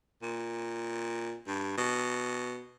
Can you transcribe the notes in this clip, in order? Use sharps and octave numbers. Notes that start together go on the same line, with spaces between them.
A#2
G2
B2